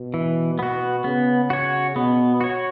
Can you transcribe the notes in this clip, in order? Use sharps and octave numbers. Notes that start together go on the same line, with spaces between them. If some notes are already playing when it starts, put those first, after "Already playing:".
Already playing: B2
E3
B3 F#4
C#3 B3
F#4 C#5
B2 B3
F#4 C#5